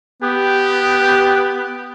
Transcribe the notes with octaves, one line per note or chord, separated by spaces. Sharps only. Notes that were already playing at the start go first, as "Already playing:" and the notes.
B3 G4